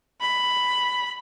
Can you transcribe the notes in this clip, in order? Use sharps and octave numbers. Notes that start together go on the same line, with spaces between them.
B5